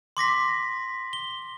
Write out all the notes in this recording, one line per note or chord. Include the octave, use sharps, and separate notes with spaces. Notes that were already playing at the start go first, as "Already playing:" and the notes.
C6 D6 A#6 B6
G7